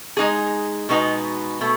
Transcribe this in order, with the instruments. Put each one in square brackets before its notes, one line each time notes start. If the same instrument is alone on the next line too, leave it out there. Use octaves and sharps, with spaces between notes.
[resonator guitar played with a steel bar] G#3 D#4 G#4
B2 G#3 B3 D#4 F#4
B2 A3